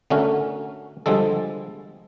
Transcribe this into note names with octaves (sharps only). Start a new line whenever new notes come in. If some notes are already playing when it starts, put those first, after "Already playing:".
D3 A3 C#4 F#4 A#4
D3 F3 G3 G#3 A4